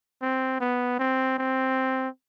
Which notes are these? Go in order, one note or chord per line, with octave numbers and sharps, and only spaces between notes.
C4
B3
C4
C4